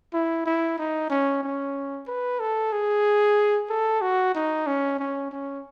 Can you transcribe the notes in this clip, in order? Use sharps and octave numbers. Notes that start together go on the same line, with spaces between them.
E4
E4
D#4
C#4
C#4
B4
A4
G#4
A4
F#4
D#4
C#4
C#4
C#4